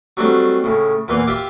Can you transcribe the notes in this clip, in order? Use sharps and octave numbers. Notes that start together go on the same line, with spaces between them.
F#3 G3 A3 C4 D4
A2 C#3
E2 A#2 E3 B4 C6
F4 G4 E5 D6